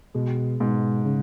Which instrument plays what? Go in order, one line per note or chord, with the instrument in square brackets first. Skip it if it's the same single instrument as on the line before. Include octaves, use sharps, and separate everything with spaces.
[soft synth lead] B2 [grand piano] G#3
[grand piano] G#2 [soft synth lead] B2
[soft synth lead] C#3